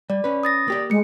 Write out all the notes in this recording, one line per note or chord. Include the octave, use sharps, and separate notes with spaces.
G3 D5
C#4 B4
D#6 A6 A#6
A#3 G4 D5
G#3 A3 C#7